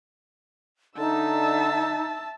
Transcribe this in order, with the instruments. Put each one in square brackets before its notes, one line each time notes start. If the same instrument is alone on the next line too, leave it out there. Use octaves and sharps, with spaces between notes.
[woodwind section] D3 [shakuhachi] D#4 [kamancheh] E5 E6 [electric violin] A5